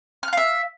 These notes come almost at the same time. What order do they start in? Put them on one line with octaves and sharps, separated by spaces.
F6 F#6 F5 E5